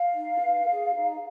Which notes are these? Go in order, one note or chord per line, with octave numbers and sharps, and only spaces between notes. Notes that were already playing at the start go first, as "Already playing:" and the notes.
Already playing: F5
D#4
B4
G#4
D#4